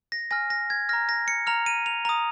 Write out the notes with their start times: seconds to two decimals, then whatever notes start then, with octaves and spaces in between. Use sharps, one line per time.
0.12 A#6
0.31 G#5 F6 A#6
0.50 A#6
0.70 G#6
0.89 F6 A#6
0.93 A#5
1.09 A#6
1.28 C#7
1.47 A#5 F6 F7
1.66 D#7
1.86 F7
2.05 A#5 D#6 F7